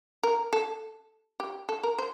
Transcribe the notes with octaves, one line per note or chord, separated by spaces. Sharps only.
A#4
A4
G4
A4
A#4
C5